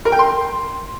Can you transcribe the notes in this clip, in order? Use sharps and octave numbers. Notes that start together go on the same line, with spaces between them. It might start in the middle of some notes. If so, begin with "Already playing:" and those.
A#4
G5
C6